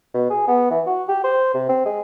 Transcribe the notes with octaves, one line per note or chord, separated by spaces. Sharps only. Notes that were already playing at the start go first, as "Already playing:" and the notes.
B2
G#4
B3
E3
F#4
G4
C5
C3
C4
G#3